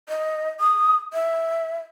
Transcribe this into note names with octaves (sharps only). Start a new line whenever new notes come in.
D#5
D#6
E5